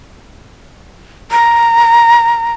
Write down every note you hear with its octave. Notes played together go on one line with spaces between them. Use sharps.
A#5